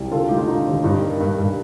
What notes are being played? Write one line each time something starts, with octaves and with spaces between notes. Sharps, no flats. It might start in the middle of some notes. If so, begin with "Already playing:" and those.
Already playing: C2
D3 F4 A4
A3 D#4 G4
F4
D3 D#4
D#2
G2 D#4
A#3
G2
G2